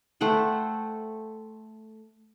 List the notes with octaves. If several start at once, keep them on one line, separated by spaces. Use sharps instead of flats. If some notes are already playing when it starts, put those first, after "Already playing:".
A3 C5 F#5 G5